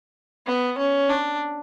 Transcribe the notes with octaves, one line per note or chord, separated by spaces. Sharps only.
B3
C#4
D4